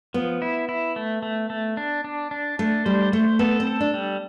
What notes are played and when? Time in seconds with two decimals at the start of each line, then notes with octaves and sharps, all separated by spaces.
0.14 F3 B3
0.42 E4
0.69 E4
0.96 A3
1.23 A3
1.50 A3
1.77 D4
2.04 D4
2.31 D4
2.59 A3 D4
2.86 G3 C5
3.12 A3 C5
3.39 B3 A4
3.60 C4
3.67 A4
3.81 D4
3.94 G3